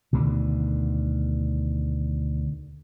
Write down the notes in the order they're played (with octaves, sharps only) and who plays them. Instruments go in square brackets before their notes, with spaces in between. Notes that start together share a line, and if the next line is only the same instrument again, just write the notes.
[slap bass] D2 B2 D3 D#3